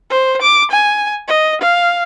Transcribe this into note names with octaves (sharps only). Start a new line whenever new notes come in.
C5
D6
G#5
D#5
F5